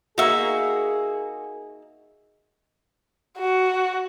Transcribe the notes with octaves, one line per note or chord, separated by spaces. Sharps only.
A#3 D#4 F#4 G#4 E5
F#4